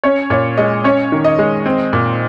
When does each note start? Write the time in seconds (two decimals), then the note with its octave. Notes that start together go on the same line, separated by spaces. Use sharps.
0.04 C#4 C#5
0.30 A#2 C#5
0.57 G#3 D#5
0.84 C#4 C#5
1.12 D#3
1.24 D#5
1.39 G#3
1.66 C4
1.93 A#2